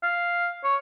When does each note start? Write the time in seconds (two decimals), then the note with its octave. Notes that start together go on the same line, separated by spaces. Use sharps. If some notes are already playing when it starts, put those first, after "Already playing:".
0.03 F5
0.64 C#5